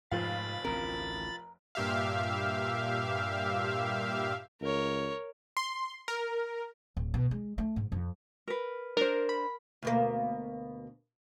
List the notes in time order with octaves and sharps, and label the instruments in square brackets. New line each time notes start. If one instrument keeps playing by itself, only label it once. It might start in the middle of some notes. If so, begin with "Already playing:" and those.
[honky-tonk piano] F1 F3 F5 [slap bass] G#2 [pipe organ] B5 A6
[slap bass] A1 D2 C4 [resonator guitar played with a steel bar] A#4
[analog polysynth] G2 A#2 G4 E5 F5
[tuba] C#2 [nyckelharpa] A#4 C#5
[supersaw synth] C6
A#4
[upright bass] D1
B2
G#3
A3
G#2
F2
[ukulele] A#4 B4
[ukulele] D4 C5 [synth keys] A#4
[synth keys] B5
[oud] D2 B2 A#3